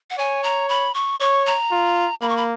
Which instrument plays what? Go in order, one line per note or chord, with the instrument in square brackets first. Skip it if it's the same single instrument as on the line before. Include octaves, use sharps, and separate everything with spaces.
[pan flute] F#5
[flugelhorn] C#5 [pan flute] G#5
[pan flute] A#5
B5
C#6
[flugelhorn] C#5 [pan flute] C#6
[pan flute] A#5
[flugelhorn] F4
[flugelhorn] A#3 [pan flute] B5
[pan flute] C#6
B5